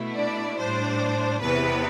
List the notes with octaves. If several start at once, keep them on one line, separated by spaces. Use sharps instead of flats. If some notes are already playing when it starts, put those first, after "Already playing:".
Already playing: B2 A3 E4
D4 D5
A2 G3 D4 C5
E2 C3 E3 B3 B4